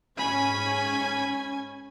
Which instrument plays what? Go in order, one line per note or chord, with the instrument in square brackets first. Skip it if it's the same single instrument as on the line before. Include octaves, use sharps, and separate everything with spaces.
[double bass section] G#2 [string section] C#4 G#5 G#6 [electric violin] B5